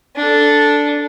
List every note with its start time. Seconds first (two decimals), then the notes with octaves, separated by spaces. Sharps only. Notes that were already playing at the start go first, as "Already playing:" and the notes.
0.16 D4 A4